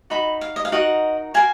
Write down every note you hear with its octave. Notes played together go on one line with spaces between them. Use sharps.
D#4 F#4 B5
F5
D#5
F5
D#4 F#4 A#4 D#5 F#5
F#4 A#4 F5 G#5